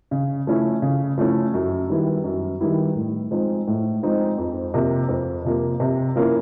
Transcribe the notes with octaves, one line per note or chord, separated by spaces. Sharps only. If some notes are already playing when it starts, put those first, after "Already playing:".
C#3
F3 A3 C#4 E4
C#3
F3 A3 C#4 E4
F#2
D#3 G3 B3 E4
F#2
D#3 G3 B3 E4
A2
F3 G#3 C4 D#4
A2
F3 G#3 C4 D#4
F2
C3 F3 A#3
F2
C3 F3 A#3
C3
F3 A#3 C#4 E4